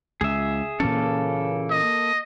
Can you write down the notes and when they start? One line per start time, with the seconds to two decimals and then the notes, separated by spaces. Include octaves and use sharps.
0.21 C#2 G#4 E5
0.80 A#2 C#3 E3 A#3 C#4 A4
1.71 D#5